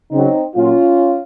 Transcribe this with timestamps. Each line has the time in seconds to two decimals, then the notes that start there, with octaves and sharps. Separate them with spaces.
0.11 C#3 F#3 C4 D#4
0.55 A#2 F#3 C#4 F4